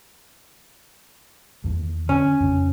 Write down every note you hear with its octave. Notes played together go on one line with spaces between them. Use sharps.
E2 D#3
D3 C#4
F2 C#3 D4